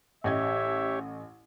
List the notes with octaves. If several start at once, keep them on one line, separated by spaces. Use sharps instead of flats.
A1 G4 C#5 D#5 E5 G#6